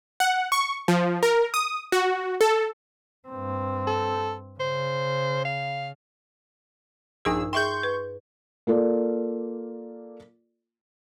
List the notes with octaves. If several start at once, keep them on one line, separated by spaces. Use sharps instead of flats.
F#5
C#6
F3
A#4
D#6
F#4
A4
G2 C4
A4
C#3 C5
F5
A#1 G2 D#4 G#4 A#4 E6
G#4 E5 G5 C6 C#6 G6
B4
A#3 F4 A4 D5